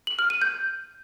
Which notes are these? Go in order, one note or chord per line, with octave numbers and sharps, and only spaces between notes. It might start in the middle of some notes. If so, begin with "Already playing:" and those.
F#7
F6
D#7
G6